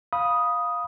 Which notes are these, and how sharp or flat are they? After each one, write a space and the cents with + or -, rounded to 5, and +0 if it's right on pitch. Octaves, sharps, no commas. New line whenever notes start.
F5 +5 B5 -15 D#6 +0